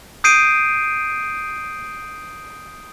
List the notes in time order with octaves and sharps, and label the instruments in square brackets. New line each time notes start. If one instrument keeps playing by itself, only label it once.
[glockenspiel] D#6 G6 C7 D7 D#7